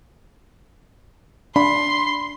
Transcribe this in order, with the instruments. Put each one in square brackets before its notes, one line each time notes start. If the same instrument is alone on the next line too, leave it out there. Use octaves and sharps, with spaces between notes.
[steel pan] D4 [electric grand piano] B5 [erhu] C6